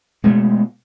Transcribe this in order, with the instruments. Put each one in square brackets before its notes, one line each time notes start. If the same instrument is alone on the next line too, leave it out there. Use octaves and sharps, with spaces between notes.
[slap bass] B2 G#3 A3